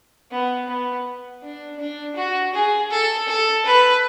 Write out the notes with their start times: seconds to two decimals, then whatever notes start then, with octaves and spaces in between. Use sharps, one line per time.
0.31 B3
0.68 B3
1.43 D4
1.79 D4
2.16 F#4
2.54 G#4
2.91 A4
3.29 A4
3.66 B4